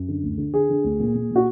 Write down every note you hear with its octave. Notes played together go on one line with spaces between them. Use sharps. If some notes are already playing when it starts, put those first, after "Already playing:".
Already playing: F#2
D3
D2
D3
D3 G#4
D3
D2
A#2
A#2
A#2 F#4